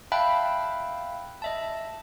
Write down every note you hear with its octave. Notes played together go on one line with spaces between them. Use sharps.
E5 F5 G5 A5 B5 F#6
D#5 E5 A5